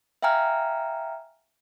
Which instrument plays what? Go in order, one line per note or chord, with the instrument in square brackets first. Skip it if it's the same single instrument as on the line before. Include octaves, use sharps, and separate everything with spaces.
[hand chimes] E5 F5 G5 G#5 A#5 F6